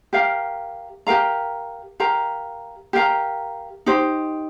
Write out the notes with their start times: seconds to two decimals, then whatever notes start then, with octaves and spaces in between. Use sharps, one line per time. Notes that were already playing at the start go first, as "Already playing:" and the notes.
0.13 G4 A#4 F5 A#5
1.07 G4 A#4 F5 A#5
2.00 G4 A#4 F5 A#5
2.93 G4 A#4 F5 A#5
3.86 D#4 G4 C5